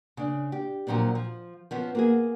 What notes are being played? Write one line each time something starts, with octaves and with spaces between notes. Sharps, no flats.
C#3 D4
G4
A#2 F3 F#3 C4 D4
F3
F3 B3 C#4
A#3 F#4 G#4